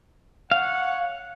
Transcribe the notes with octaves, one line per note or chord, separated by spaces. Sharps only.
C#5 F5 F#5